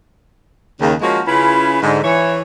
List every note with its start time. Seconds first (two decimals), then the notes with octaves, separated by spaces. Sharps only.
0.80 D#2 C#3
1.02 F3 G#3 A#3 C#4 F4 F#4
1.26 C#3 C#4 E4 F4 B4
1.83 G#2 D3
2.03 E3 C#5